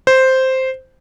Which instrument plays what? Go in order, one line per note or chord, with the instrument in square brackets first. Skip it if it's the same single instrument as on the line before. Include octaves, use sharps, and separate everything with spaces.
[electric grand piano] C5